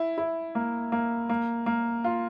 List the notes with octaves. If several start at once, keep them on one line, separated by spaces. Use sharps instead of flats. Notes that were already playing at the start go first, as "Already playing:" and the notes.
Already playing: E4
E4
A#3
A#3
A#3
A#3
F4